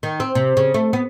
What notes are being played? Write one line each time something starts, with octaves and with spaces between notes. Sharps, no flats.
D#3
C4
C3
C#3
A3
B3